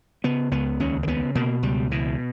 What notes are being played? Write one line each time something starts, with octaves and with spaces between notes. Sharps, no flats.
C#3 B3
C#2 B3
D#2 C#4
A#3
C#3 B3
B2 A#3
C#2 G3
B2 E3